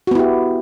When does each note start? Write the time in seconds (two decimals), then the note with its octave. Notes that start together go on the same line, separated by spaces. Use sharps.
0.07 F#4
0.11 B3
0.15 E4
0.19 G4